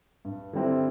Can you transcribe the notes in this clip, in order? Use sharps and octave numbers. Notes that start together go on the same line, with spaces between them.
G2
D3 G3 C4 E4